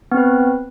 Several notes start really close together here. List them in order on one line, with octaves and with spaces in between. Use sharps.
B3 C4 B4